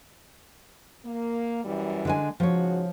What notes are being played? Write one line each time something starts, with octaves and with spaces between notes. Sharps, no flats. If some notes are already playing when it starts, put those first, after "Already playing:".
A#3
F#2 E3 G3
D3 G#3 G#5
G#2 C#3 F3 F#4 C#5